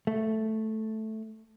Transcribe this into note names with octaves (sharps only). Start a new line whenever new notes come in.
A3